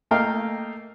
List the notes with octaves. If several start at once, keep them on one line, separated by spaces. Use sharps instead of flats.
A3 A#3 D#5 F5 G5